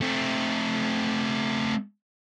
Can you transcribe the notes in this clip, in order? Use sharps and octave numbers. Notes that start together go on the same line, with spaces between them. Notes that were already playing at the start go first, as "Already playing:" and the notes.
A3 C4